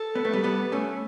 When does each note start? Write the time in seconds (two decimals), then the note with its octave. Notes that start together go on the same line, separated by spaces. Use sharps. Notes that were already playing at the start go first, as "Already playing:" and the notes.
Already playing: A4
0.15 B3
0.25 A3
0.33 G3 B3
0.43 G3 B3
0.72 A3 C#4